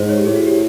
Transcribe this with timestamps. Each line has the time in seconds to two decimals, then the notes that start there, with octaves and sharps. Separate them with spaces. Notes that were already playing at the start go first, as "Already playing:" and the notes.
Already playing: G#2 C5
0.09 C#5
0.17 G4
0.25 A2 G#4
0.36 F#4
0.46 G4